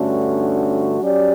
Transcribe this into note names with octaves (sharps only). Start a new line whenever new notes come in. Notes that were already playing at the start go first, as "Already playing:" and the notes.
Already playing: G2 D3 A3 C#4 F#4
F#3 C#4 G4 D5